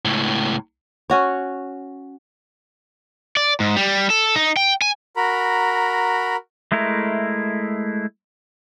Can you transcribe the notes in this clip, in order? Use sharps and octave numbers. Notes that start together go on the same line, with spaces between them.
C#2 A2
C#4 F#4 C#5
D5
G#2
G3
A4
D#4
G5
G#5
F#4 A#4 A#5 B5
G#3 A3 E4 A#4